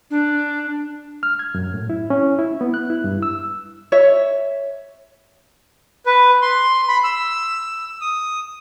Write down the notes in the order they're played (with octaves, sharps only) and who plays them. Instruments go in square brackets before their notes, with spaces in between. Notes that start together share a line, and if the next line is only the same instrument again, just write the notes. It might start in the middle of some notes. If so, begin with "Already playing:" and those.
[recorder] D4
[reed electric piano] F6
G#6
F#2
A2
E4
C#4
E4
B3
F#6
E4
G2
E6
[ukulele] C#5 E5
[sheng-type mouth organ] B4
C6
B5
E6
D#6